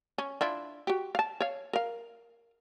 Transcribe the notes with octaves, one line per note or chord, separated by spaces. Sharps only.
C#4
D4 E4 F4
F#4 G4
F5 A5
C#5 F5
A#4 F5